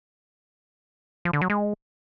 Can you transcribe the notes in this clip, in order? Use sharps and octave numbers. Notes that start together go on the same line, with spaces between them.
F3
D3
F#3
G#3